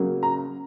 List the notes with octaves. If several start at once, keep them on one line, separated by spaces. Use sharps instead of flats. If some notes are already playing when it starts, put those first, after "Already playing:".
Already playing: C#3 F#3 A#3
A#5